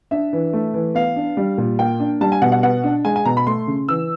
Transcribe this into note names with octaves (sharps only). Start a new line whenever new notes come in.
D4 E5
E3
A3
E3
B3 F5
D4
G3
A#2
A#3 G5
D4
G3 A5
G#5
B2 F#5
F#5
B3 F#5
D4
G#3 G#5
G#5
B2 A#5
B5
A3 C6
C#3
E3 E6